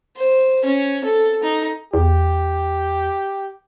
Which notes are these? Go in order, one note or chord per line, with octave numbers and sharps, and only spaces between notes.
C5
C#4
A4
D#4
E2 G4